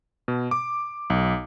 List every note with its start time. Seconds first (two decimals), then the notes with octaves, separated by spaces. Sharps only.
0.28 B2
0.51 D6
1.10 B1